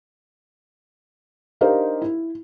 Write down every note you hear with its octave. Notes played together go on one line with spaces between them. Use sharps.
D4 D#4 G4 A#4 C5 F5
E4